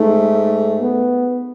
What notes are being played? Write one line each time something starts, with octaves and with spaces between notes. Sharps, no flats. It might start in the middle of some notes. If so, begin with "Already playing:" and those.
Already playing: G#2 A3
B3